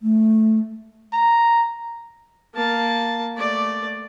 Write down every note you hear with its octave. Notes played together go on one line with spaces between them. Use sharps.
A3
A#5
A#3 A5
A3 D5